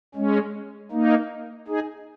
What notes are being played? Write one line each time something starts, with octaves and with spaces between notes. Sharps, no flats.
G#3 C#4
A#3 D#4
D#4 G#4